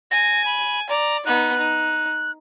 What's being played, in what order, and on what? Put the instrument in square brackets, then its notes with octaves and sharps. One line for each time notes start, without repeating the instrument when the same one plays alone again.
[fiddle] G#5 [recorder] A#6
[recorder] B5
[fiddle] D5 [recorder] A#5
[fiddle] B3 D#4 [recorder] F#6
[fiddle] D#4